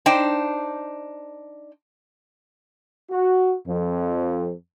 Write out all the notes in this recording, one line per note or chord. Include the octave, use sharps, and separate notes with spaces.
D4 D#4 C5 G5
F#4
F2